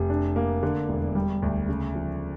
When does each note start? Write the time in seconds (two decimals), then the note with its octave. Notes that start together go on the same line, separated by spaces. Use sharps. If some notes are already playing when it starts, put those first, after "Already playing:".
Already playing: F1
0.10 D4
0.36 A#3
0.63 D3
0.89 E1
1.15 G3
1.42 D2
1.69 C#3
1.95 F3